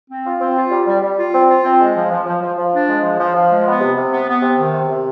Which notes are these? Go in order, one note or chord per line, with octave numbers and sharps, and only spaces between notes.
C4
F4
C4
F4
G3
G3
G3
F4
C4
F4
C4
G#3
F3
F3
F3
F3
F3
D4
G#3
F3
F3
F3
G#3
B3
C3
C3
B3
B3
C3
D#3
C3
C3